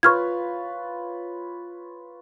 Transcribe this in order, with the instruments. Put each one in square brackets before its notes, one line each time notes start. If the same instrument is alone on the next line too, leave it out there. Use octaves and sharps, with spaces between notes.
[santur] F4 B4 C#5 [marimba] C#6 F6 G#6